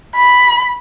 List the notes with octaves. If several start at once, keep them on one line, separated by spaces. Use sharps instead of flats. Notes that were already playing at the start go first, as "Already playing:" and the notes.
B5